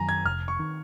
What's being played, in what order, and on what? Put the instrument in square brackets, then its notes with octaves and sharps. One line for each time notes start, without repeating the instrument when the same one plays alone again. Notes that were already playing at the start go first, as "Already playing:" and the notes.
Already playing: [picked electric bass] F#2 D#3 F#3 [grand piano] G#5 A#5
[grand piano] G#6
[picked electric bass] F1 [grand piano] F6
[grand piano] C#6
[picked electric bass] D#3